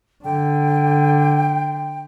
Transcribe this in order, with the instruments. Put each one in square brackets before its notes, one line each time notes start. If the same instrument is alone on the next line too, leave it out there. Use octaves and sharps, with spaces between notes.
[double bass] D3 [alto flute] G5